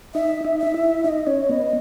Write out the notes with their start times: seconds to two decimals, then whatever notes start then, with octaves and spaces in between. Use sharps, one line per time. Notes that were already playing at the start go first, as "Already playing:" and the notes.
0.14 D#4 E5
0.45 D#4
0.59 E5
0.67 D#4
0.74 E4
1.04 D#4 E5
1.09 D#5
1.27 C#4 C#5
1.49 B3 D#5